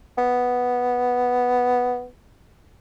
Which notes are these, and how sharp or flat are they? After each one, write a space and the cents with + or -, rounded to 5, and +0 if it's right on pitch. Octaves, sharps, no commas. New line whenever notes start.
B3 +0